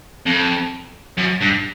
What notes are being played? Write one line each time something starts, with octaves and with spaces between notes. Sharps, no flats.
F2
F#2
G2